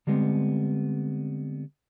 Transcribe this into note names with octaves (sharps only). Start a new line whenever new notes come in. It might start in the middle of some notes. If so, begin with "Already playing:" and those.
D3 G3 G#3 B3 C4